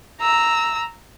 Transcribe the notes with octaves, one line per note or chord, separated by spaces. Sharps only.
A#5 E6